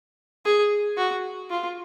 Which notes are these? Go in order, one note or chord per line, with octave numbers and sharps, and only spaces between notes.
G#4
F#4
F4